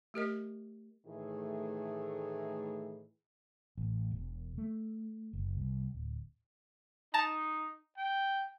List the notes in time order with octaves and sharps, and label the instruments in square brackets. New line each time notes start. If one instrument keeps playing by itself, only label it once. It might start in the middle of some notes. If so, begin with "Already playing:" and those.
[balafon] A3 G4 A#4 D#5
[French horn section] A2 D#3 E3 A3 G#4
[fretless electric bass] A1
E1
A3
F#1
C2
D1
[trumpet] D#4 [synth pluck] A5 A#5
[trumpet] G5